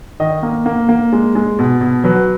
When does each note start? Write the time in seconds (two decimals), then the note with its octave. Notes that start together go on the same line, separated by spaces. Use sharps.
0.20 D#3 D#5
0.43 A#3
0.66 A#3
0.89 A#3
1.13 G#3
1.35 G#3
1.59 B2
1.81 B2
2.04 F#3 B4